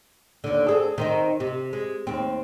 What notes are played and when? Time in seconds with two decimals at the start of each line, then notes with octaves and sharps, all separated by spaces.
0.44 D#2 D3
0.67 C4 G#4 A4
0.98 D#3 C4 D#4
1.40 C3
1.73 G#3
2.07 D#2 C4